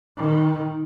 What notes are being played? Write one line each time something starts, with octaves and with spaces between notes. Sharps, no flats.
D#3